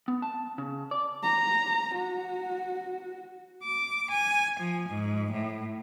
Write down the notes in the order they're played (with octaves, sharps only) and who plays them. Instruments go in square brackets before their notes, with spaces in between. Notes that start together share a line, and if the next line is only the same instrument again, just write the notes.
[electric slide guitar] B3
A5
C#3
D5
[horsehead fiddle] A#5
F#4
[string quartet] D6
G#5
F3
G#2
A2